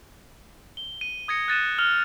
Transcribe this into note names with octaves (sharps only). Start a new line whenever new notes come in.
G7
D#7
D#6 G#6 A#6 C#7
F#6 A6 D#7 E7
F6 F7